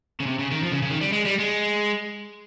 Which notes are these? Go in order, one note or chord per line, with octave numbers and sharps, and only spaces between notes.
C#3
C3
C#3
D#3
F3
C#3
C#3
D#3
G3
G#3
G3
G#3